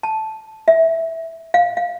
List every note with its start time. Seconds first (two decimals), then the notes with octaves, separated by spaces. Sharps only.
0.03 A5
0.68 E5
1.54 F5
1.77 F5